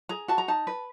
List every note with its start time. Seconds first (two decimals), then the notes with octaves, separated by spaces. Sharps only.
0.09 G#4 A#5
0.28 F#4 A5
0.38 A#5
0.48 D#4 A5
0.67 B4